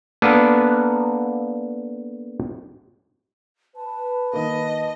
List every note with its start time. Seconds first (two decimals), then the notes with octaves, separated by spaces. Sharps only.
0.22 A#3 B3 D4 A4 B4
3.76 B4 A5
4.33 D#3 A#3 D#5